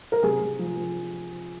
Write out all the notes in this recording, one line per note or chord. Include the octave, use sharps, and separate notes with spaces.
A#4
C3 G#4
C3
F3
F3